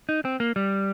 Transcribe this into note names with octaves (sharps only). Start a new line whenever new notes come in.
D#4
C4
A#3
G3